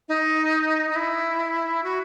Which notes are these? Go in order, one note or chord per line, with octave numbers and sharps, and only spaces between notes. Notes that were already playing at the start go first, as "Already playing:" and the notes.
D#4
D#4
E4
F#4